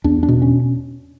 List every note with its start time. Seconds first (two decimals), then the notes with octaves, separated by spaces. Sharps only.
0.04 E2 D4
0.23 D4
0.28 B2
0.42 C#4